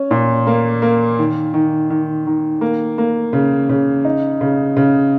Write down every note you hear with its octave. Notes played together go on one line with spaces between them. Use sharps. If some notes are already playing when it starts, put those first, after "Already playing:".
Already playing: C#4
A#2
A#3
A#3
D#3
D#3
D#3
D#3
A#3
A#3
C#3
C#3
D#4
C#3
C#3